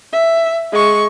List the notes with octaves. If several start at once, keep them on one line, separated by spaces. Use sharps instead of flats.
E5
G#3 C#6